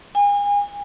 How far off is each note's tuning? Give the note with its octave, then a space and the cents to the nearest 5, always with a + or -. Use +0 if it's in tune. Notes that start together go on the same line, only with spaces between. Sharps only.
G#5 -35